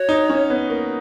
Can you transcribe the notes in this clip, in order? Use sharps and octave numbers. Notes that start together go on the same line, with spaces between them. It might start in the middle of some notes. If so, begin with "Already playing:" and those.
Already playing: F#4 C#5
D#4
C#4
B3
A#3